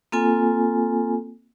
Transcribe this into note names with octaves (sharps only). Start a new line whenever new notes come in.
A#3 C4 F4 A4 G#5